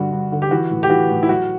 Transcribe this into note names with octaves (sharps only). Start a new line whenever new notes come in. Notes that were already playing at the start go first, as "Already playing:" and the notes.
Already playing: G2 D3 F#4
G2
D3
G4
E3 F#4
A2
G4
E3 F#4
A2
E4
F#3 F#4